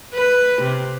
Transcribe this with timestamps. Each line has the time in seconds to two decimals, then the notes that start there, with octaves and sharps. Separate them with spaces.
0.14 B4
0.62 C3